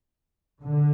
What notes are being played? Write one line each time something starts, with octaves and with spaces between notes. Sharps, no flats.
D3